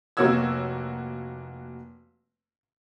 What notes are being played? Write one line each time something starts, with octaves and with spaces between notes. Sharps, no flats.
F1 A#3 F#4 C#5 E6 G#6